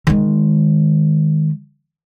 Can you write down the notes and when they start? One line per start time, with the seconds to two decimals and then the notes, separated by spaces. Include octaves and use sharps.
0.07 D#3 G#3